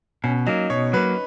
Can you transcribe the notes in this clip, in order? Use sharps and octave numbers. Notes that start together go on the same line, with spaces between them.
B2 C#4
F#3 A#3 D#4
B2 C#5
F#3 A#3 B4